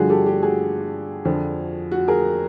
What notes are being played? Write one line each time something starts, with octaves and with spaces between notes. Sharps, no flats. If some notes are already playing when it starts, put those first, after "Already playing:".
Already playing: G2 D3 F3 F#4 G#4
G4 A4
G4
F#4 G#4
F2 D3 F3
F#4
G#4 A#4